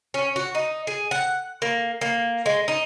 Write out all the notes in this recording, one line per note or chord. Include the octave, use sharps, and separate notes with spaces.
C#4
F#4
D#4
G#4
F#5
A#3
A#3
G#3
D#4